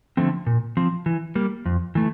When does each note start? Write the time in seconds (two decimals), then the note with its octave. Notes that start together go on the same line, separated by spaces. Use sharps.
0.17 D3 F3 A3 C4
0.47 A#2
0.77 F3 C4
1.06 E3
1.35 G3 A#3
1.66 F2
1.95 E3 A3